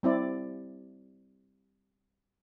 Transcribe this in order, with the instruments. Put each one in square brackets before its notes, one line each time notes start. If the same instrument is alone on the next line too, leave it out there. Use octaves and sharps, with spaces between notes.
[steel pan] G3 C4 E4 D5